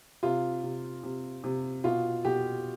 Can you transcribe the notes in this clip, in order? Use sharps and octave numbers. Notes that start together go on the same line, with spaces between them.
C3 F4
C3
C3
C3
B2 F4
B2 G4